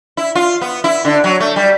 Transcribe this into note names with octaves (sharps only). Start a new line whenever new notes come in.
E4
F4
B3
E4
D3
F#3
A3
G3